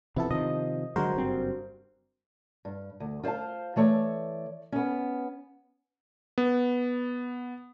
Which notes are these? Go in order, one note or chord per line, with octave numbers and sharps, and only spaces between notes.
C3 E3 F3 B3 E4 A4
C3 D#3 F3 D#5
D3 F#3 G#3 F#4 A#4 C5
F#1 G2 C4
G2
D2
F4 C5 D5 F5 A5
E3 A3 C#5 D5
B3 C#4
B3